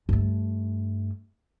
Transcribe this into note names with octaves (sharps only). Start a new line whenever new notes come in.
G2 A3